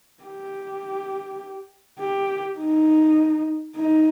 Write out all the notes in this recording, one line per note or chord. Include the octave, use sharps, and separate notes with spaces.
G4
G4
D#4
D#4